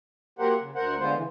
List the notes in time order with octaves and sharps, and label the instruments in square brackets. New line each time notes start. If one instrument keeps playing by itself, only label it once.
[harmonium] F#3 A#3 G4 A#4 C5 F#5
C#3
D2 A#4 C5 F#5
D3 G#3 B3 F4 C5
C#3 E3